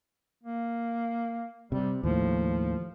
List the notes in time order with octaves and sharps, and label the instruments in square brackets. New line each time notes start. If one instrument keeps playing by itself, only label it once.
[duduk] A#3
[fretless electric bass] C3 [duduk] G3
[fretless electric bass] D#2 A2 [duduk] F3